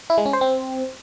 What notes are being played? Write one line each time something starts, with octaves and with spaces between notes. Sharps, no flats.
E4
G#3
C#4
C5
C4